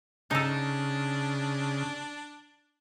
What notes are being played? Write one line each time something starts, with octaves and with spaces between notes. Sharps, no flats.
C#3 D4 D#4 A4